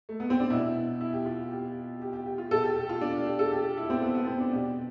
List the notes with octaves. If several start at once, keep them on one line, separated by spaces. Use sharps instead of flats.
A3
B3
C4
D4
B2 E4
E4
G4
F4
G4
G4
G4
G4
F4
B2 A4
G4
G4
F4
D4
G4
A4
G4
G4
E4
C4
B3
B3
C4
D4
B2 G4